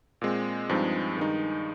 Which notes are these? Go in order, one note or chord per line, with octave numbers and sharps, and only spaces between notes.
A#2 G#3 C4
G2 F3 G#3 C4 D#4
G2 D#3 G#3 D#4